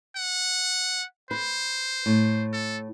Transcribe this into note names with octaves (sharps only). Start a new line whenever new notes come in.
F#5
B4 C5
A2
A4